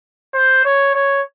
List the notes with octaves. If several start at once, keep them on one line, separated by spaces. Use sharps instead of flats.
C5
C#5
C#5